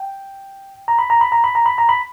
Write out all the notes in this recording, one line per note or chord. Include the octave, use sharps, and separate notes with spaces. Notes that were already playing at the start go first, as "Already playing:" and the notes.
Already playing: G5
A#5
B5
A#5
B5
A#5
B5
A#5
B5
A#5
B5